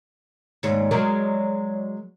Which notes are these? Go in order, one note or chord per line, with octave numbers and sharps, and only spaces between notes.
D#2 G#2 G#4 C#5 D5
F#3 G#3 A#4